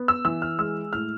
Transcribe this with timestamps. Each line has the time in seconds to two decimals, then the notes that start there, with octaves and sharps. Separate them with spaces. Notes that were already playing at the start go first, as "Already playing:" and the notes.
Already playing: B3
0.08 E6
0.25 E3 E6
0.42 F6
0.59 G#3 E6
0.93 A2 F6